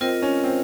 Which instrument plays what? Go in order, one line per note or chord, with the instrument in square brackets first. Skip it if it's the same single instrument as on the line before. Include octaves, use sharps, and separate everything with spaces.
[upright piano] C4 [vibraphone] F4 A#4 D#5
[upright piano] C#4
C4